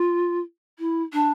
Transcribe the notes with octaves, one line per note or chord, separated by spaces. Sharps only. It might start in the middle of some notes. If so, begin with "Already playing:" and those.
Already playing: F4
E4
D4